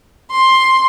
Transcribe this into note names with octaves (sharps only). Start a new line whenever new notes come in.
C6